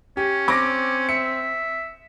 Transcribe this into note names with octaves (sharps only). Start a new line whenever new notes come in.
C#4 G4
C4 D6 A#6
E5 C#7